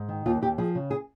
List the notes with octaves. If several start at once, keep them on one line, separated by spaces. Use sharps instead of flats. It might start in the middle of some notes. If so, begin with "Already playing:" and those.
Already playing: G#2
D#3
D#2 F4
D#2 G4
F3 G#4
C#3
G#4